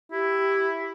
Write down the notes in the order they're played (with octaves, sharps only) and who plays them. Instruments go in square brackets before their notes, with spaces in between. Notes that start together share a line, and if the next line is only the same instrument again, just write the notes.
[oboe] E4 [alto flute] G4